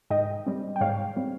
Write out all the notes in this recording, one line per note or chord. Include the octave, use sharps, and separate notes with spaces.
G#2 D#5 G5
G3 C4
G5
G#2 C#5 F5
G3 C4